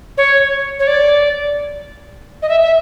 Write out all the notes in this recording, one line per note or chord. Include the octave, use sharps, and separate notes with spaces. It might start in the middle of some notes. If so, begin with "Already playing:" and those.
C#5
C#5
D5
D#5
E5
E5